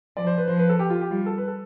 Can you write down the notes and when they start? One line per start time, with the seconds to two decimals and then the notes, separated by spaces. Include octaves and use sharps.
0.17 F3 D5
0.27 C5
0.37 B4
0.48 F3 C5
0.59 B4
0.69 A4
0.79 G4
0.90 F4
1.01 G4
1.11 G3 F4
1.26 A4
1.37 B4
1.48 A4